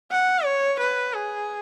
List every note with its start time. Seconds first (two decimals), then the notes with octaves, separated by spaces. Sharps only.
0.11 F#5
0.45 C#5
0.80 B4
1.14 G#4